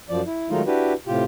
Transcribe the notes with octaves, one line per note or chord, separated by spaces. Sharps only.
F#2 F3 D5
E4
D#3 F#3 G#3 A3 D#4 F4
D4 E4 F#4 G4 B4
A2 C3 F4 G4